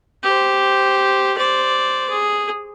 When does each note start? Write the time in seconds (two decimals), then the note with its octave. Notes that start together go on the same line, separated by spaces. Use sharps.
0.23 G4 C5
1.37 C5 D5
2.10 G#4